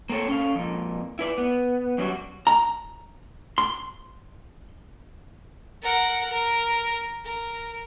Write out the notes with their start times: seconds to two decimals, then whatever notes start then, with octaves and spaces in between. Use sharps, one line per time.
0.09 A#3 C4 A4 C#5
0.28 C#4 A4 F5
0.55 F2 A#2
1.19 E4 B4 D5
1.38 B3
1.98 F#2 F#3 G3 F#4
2.47 A#5
3.58 C6
5.82 A#4 F#5
6.31 A#4
7.25 A#4